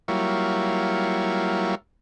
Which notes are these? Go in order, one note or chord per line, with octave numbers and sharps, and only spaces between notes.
F#3 G3 A#3 E4 F4 C#5